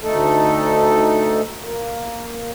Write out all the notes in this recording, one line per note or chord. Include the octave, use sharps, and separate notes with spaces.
D2 A3 D#4 A4
A#3